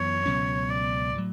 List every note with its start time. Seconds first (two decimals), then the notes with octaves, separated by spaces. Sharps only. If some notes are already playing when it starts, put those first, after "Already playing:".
Already playing: F#2 E3 B3 C#5
0.26 C#2 B2 F#3 C#4
0.71 D5
1.15 A2 F#3